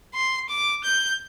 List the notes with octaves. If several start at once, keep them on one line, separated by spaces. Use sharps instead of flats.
C6
D6
G6